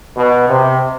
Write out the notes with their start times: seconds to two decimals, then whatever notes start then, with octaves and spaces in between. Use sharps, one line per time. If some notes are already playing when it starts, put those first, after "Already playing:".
0.17 B2
0.49 C3